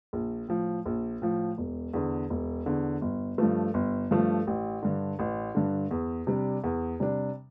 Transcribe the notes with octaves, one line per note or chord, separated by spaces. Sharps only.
A#1
A2 F3
A#1
A2 F3
E1
E2 D3
E1
E2 D3
G1
G2 F3 A3
G1
G2 F3 A3
A1
G2 D3
A1
G2 D3
E2
C3 G3 D4
E2
C3 G3 D4